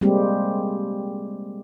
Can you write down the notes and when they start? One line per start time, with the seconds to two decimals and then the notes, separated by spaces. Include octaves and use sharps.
0.01 G3 G#3 A#3 C4 G4